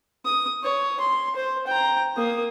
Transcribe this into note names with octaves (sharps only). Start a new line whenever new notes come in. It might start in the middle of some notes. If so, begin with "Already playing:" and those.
D#6
C#5
C6
C5
G5 A#5
A#3 D#6